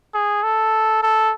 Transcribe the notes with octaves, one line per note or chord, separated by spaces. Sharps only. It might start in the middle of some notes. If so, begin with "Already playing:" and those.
G#4
A4
A4